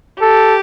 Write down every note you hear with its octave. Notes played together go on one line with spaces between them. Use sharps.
G4 A4